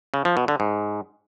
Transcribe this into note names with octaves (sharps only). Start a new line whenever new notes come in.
C#3
F3
B2
D3
G#2